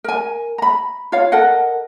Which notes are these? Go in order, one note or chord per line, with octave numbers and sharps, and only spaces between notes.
A#4 G#5
A#5 B5
F4 C#5 F5
A4 A#4 D#5 F#5